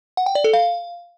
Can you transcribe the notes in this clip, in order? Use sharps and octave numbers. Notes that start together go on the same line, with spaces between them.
F#5
G5
D5
A4
F5